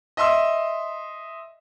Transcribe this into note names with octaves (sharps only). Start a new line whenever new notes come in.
D#5 E5 C6 E6